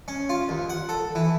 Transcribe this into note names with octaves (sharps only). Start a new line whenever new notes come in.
C#4
F4
D#2
F#5
A4
E3